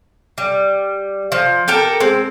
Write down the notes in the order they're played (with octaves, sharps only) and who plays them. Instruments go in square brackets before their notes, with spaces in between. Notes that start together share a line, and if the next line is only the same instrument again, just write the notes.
[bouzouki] G3
F3
G4 A4 A#4 G5
G#3 C4